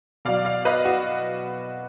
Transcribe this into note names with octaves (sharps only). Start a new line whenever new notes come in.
B2 F#3 D5 F5
D5 F5
B4 D#5
F#4